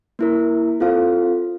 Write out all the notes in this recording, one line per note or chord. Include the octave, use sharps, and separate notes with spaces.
A#3 E4 A#4
C4 F4 A4 C5 F5